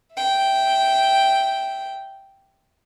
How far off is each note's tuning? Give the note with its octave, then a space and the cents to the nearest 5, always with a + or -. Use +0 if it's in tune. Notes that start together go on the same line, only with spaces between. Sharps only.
E5 +0 G5 -5